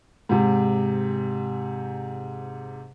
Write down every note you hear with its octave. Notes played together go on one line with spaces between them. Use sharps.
G#2 C3